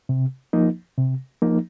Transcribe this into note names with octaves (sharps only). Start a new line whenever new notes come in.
C3
F3 A#3 D#4
C3
F3 A#3 D#4